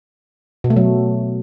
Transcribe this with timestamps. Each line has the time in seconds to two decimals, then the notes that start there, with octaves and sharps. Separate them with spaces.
0.64 B2
0.70 A3
0.76 F#3